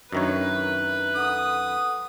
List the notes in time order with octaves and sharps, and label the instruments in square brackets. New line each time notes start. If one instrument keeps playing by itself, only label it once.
[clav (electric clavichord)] F#2 D#3 C#5 [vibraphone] D4 E5 A#5 [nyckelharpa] B4
[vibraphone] A4 F#5 [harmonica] D#6